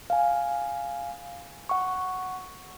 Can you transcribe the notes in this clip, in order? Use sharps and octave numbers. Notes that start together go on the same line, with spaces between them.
F5 G#5
F#5 C#6